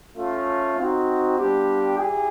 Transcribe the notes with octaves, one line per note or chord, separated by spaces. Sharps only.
A3 C#4 F4
C4 D#4 F#4
G3 B3 D4 F4 G4
E4 G4 G#4